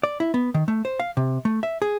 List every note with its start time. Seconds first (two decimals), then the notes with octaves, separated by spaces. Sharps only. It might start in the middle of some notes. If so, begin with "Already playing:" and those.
0.03 D5
0.20 E4
0.34 B3
0.54 D#3
0.68 A3
0.85 C5
1.00 F5
1.17 C3
1.45 A3
1.63 E5
1.82 G#4